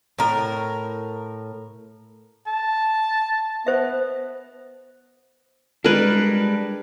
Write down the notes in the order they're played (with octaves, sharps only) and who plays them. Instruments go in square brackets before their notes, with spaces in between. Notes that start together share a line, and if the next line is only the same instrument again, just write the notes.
[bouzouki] A2 A#4
[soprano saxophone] A5
[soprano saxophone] B3 [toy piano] C5 E5
[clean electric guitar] G3 G#3 D4 [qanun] A#4 B4